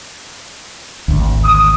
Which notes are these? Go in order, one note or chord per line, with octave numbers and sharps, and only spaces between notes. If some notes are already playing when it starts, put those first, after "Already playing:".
G#1 D2
D#6